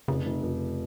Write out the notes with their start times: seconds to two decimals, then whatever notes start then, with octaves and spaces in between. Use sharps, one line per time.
0.08 F1 C#3
0.26 F1
0.43 F1